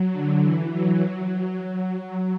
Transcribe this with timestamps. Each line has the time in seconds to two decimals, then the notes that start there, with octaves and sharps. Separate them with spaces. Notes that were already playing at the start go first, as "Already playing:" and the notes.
Already playing: F#3
0.12 D3
0.43 E3
0.72 F#3
1.60 F#3